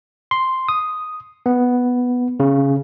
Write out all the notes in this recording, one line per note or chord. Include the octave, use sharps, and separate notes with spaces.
C6
D#6
B3
C#3